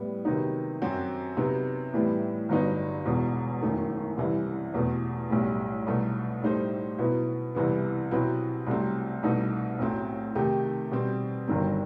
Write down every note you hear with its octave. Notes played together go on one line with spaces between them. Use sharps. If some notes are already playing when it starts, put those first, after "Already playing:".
Already playing: A2 G3 B3
C3 D#3 F#3 B3 D#4
F#2 F#3 C4 F#4
C3 F#3 B3 D#4
A2 E3 G3 B3
G1 G2 F#3 B3 D#4
E1 E2 B2
F#1 F#2 D#3 A3
C2 C3 E3
E2 B2 A3
B1 A2 G3
C2 B2 F#3 A3
A2 G3 D#4 A4 C5
B2 F#3 B3 E4
C2 C3 E3 B3
B2 F#3 C4 E4 B4
C2 C3 F#3 A3 C4
C2 B2 A3 D#4 A4
B1 A2 F#3 A3 C4
C3 D#3 A3 D#4 G4
B2 G3 C4
G1 G2 D#3 F#3 C4